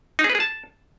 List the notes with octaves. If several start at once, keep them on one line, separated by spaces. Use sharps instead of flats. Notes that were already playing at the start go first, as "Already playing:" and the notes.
D#4
G#4
B4
G#4
A5